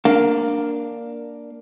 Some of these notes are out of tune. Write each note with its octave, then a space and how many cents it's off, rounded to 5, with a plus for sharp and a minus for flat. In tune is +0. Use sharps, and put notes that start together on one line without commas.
A#3 +0 D4 +0 F5 +15